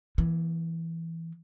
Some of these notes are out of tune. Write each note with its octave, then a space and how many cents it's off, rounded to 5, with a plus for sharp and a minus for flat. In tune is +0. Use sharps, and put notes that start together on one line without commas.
E3 +5 A#3 +40